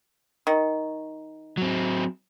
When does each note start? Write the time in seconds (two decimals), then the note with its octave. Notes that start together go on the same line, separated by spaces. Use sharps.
0.47 D#3
1.57 F#3 C4